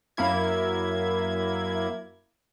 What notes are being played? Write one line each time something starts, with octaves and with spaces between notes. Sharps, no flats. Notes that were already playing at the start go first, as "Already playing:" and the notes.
F#2 A#3 E4 G#6